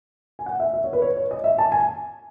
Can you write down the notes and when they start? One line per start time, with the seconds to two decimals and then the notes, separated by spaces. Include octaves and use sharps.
0.39 G#5
0.46 F#5
0.60 E5
0.74 E5
0.84 C#5
0.93 B4
1.02 C#5
1.17 C#5
1.31 D#5
1.44 E5
1.58 A5
1.72 G#5